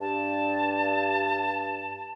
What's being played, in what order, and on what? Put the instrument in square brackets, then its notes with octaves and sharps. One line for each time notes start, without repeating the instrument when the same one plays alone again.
[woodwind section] G2 [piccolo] A5